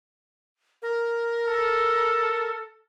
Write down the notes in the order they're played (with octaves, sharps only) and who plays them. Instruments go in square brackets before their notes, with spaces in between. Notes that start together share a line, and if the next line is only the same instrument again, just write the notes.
[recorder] A#4
[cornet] A4